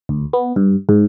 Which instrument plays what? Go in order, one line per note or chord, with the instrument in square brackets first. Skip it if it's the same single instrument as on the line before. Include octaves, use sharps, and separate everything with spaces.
[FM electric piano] D2
B3
G2
G#2